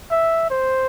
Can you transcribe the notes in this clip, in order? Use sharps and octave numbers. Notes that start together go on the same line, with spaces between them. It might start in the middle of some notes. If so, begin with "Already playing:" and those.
E5
C5